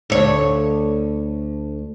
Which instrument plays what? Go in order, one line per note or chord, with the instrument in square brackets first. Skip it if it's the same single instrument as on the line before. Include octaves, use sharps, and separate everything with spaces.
[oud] D2 C#5